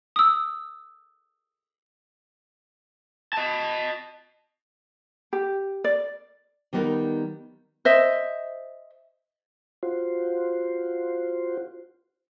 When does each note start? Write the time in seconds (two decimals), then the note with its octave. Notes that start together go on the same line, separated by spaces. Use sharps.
0.16 D#6 E6
3.33 D#5 A5
5.33 G4
5.84 D5
6.73 D#3 G3 B3 D#4 A#4
7.85 C5 D#5 E5
9.83 F4 F#4 C5